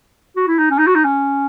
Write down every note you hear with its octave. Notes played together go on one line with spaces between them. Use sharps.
F#4
E4
D#4
C#4
D#4
F#4
D#4
C#4